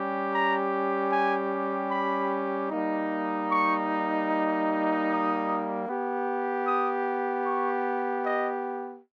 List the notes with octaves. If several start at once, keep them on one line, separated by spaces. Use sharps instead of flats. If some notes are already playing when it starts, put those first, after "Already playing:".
Already playing: G3 C#4 G4
A#5
G#5
B5
G3 A#3 D#4
C#6
D#6
B3 G4
D#6
C#6
D#5